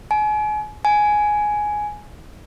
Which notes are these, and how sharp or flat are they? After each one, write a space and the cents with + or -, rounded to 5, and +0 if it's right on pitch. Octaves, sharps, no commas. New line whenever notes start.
G#5 +35
G#5 +5